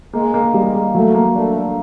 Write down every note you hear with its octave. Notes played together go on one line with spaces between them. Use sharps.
G#3 A#3
A#3
G3 G#3
A#3
F#3 A3
A#3
A3 D4
D4